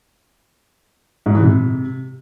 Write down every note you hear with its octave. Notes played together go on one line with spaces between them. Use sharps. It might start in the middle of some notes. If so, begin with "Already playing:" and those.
G#2
E3
C3